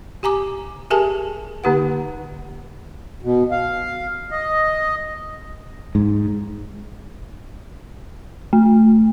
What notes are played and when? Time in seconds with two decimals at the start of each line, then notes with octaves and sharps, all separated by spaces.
0.23 G4 G#5 A#5 D6
0.90 G4 G#4 A#4 E5 G#5 A5
1.64 D3 A#3 D#4 G4 B4 F#5
3.23 B2
3.51 F5
4.31 D#5
5.95 G#2
8.53 A3